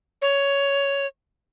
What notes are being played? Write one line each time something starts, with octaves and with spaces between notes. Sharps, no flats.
C#5